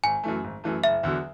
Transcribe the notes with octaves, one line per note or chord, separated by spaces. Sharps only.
G#1 G#5
F#2 E3 A3
G#1
F#2 E3 A3
F#1 E5
E2 D3 F#3